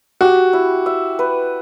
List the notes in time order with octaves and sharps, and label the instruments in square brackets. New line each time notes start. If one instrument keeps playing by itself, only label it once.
[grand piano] F#4 [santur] G4
[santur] E4
E5
B4